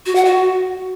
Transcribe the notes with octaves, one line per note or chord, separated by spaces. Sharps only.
F#4
F#5
F#4